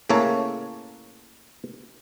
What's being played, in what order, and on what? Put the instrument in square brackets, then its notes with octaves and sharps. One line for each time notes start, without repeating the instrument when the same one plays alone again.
[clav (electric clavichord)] A2 C#3 A#3 A4 C#5